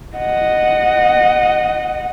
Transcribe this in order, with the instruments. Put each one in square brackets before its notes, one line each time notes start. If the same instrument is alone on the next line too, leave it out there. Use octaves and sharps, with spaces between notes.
[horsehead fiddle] D#5 F#5